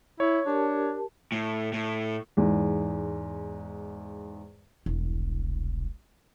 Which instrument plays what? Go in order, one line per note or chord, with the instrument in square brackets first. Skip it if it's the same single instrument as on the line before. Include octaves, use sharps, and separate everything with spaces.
[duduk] E4 [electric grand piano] C#5
[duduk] D4 [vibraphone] G4 A#4 A5
[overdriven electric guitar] A2
A2
[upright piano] E2 G#2
[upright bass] E1 C2